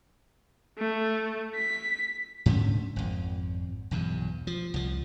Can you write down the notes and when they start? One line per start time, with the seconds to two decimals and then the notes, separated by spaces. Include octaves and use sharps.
0.78 A3
1.56 B6
2.46 G#2 D3 A3 C#4
2.96 G#1 F2
3.91 B1 E2 G2
4.47 F3
4.74 C2 F3